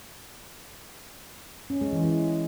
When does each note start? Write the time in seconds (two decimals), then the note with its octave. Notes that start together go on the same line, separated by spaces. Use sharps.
1.70 C#4
1.81 G#3
1.93 E3
2.04 G#3